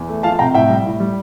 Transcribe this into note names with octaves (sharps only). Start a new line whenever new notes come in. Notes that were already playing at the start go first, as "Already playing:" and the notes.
Already playing: E2
A3
F3 F5 A5
C3 G5 A#5
A2 E5 G5
G3
A2
G3